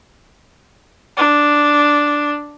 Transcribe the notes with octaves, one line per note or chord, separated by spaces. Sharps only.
D4